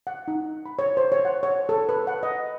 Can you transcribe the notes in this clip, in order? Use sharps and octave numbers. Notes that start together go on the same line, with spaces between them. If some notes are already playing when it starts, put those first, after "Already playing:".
F#5
D#4
B5
C#5
C5
C#5
F#5
C#5
A4
B4
F#5
D#5